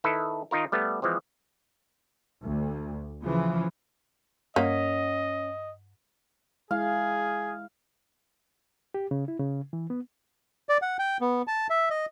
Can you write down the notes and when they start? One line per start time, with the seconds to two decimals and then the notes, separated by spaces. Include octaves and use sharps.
0.04 D#3 E4 A4 B4
0.51 D#3 D#4 F4 A#4
0.72 G3 A3 B3
1.02 E3 F3 G#3 C4
2.43 D2
3.21 C#3 E3 F3
4.56 G2 A#3 C#4 D#5 F#5 B6
6.71 G#3 E4 G#4 F5
8.94 G4
9.11 C#3
9.28 E4
9.40 C#3
9.73 E3
9.90 B3
10.69 D5
10.82 F#5
10.99 G5
11.21 B3
11.47 A5
11.70 E5
11.90 D#5